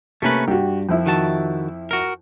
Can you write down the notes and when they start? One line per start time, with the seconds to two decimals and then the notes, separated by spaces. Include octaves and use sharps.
0.22 C3 A3 A#3 C#4 B4
0.48 G2 F#4 G4
0.89 F2 F3 E4
1.06 D#3 F#4 A5
1.91 F#4 A#4